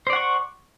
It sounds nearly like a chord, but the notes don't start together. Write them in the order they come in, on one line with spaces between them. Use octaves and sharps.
C5 D5 F#5 C#6